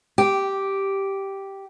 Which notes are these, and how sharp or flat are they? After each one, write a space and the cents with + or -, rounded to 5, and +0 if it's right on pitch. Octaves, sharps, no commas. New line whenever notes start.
G4 -5